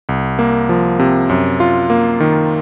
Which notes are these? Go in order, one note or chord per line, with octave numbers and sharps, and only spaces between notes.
C2
A#3
F3
C3
F#2
F4
A#3
D#3